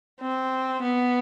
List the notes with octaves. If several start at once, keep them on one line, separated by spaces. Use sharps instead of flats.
C4
B3